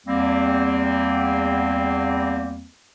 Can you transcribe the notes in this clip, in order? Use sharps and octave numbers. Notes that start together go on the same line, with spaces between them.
E2 G3 A#3 C4